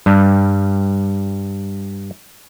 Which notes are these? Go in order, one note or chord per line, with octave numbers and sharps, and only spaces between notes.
G2 G3